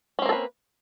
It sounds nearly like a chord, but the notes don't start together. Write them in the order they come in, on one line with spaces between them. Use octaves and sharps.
C#4 C4 A#3 A4 B4